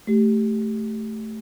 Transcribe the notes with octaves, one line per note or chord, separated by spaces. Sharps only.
A3 G4